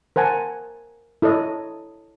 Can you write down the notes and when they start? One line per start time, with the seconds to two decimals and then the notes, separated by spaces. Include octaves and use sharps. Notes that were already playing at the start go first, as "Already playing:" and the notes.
0.16 A#4 C5 F#5 G#5 A5
1.22 E4 A4 C#5 D#5